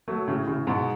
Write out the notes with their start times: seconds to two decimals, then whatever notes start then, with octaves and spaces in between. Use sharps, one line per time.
0.08 F#3 A3
0.27 A2 C#3
0.47 A2 C#3
0.67 G#2 B2